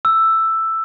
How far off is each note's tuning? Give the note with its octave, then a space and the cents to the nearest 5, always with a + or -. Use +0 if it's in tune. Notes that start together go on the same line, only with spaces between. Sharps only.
E6 +5